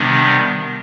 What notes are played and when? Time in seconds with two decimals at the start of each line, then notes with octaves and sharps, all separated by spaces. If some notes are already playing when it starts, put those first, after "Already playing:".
Already playing: C3 D#3 G3 B3 D4